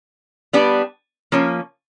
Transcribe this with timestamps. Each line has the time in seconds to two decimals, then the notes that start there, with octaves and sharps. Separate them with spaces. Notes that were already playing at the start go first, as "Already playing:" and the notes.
0.53 G3 B3 D4 G4
1.32 F3 A#3 C#4